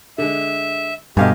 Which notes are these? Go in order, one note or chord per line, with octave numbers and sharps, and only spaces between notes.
D3 G#3 E5
G2 B2 A3 G4 D#5 F5 G#5